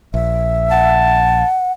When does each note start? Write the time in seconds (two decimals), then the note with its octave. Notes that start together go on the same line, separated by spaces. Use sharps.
0.14 A#1 E5
0.71 F#5 A5